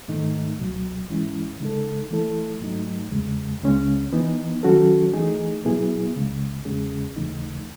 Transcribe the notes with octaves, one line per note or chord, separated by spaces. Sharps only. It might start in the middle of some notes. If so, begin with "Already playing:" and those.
G#2 D#3 A3 D#4
C#2 B2 F#3
G#2 E3 G#3 C#4 E4
C#3 G#3 D#4 A4
E3 A3 E4 A4
G#2 F#3 A3 D#4
E2 C#3 G#3
C#2 C#3 G#3 C#4
E3 B3 D#4
D#3 F#3 C#4 F#4 A4
E3 A3 D#4 G#4
B2 F#3 B3 E4 G#4
C#2 C#3 G#3
E2 C#3 G#3 C#4 G#4
D#2 C#3 E3 A3 D#4